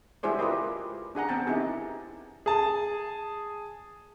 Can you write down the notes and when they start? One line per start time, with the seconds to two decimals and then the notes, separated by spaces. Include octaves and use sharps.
0.23 G#3 E4 G4 G#4 C5 D5
0.39 F4 G4 A#4 B4 D5 D#5
1.15 D4 G#4 F#5 A#5
1.28 B3 C4 G5 A5 A#5
1.47 D#4 E4 G4 G#4
2.46 G#4 A5